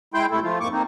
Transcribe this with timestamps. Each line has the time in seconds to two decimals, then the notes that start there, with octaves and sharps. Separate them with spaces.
0.14 G#3 E4 G5 C6 G6
0.31 D2 C3 A3 E4 A4
0.43 F3 A3 F4
0.60 F2 G#2 A#3 C#6 D6
0.72 A#3 C4 D#4